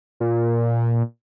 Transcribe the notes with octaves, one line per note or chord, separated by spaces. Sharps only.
A#2